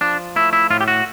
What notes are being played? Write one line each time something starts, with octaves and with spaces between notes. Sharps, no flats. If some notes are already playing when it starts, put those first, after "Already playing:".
F3 D4
A3 E4
E4
A2 F4
G4
F#4